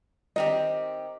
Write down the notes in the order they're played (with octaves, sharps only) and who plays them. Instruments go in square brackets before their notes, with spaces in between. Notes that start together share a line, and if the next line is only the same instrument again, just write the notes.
[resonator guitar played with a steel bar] D#3 C4 G4 [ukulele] D#5